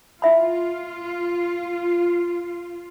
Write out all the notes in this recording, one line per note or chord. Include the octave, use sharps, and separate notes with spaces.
E4 F4 E5 B5